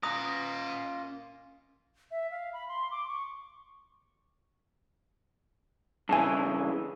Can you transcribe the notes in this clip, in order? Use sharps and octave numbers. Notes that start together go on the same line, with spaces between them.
A#3 C#4 F4 D#5 F#5 A#5 D#6
E5
F5
B5
C6
D6
C#6
G2 C#3 E3 G#5 A5